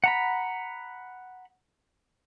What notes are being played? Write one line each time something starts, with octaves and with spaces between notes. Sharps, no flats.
F#5 A#5 B5